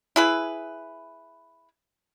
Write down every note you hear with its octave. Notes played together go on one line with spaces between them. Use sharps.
E4 G#4 B4